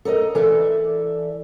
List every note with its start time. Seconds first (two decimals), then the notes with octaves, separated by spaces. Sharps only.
0.05 A4 A#4 D5 D#5
0.35 E3 A4 D5 E5